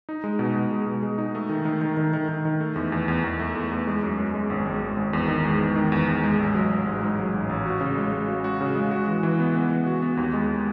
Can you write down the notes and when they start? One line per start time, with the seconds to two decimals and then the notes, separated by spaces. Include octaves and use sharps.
0.09 D#4
0.24 G#3
0.39 B2
0.56 B2
0.71 G#3
0.86 B2
1.03 G#3
1.18 D#4
1.35 A3
1.49 D#3
1.65 D#3
1.82 D#3
1.97 D#3
2.13 D#3
2.29 D#3
2.45 D#3
2.60 A3
2.76 E2
2.92 E2
3.08 E2
3.24 E2
3.39 A3
3.55 E2
3.71 E2
3.87 G#3
4.03 F#2
4.18 F#2
4.34 G#3
4.50 G#1
4.65 G#3
4.81 G#1
4.97 G#1
5.13 E2
5.28 D#3
5.45 G#3
5.61 E2
5.76 D#3
5.92 E2
6.08 E2
6.24 G#3
6.38 A1
6.54 F#3
6.71 F#3
6.87 G#2
7.02 G#2
7.18 F#3
7.34 A1
7.49 A1
7.66 F#4
7.81 C#3
7.97 G#3
8.12 G#3
8.28 F#4
8.44 F#4
8.61 C#3
8.75 G#3
8.91 F#4
9.07 E3
9.23 E3
9.39 B3
9.55 B3
9.70 E3
9.86 F#4
10.02 B3
10.17 D#2
10.33 G#3